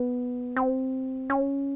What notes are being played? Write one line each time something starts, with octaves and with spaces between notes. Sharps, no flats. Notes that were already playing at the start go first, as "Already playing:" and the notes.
Already playing: B3
C4
C#4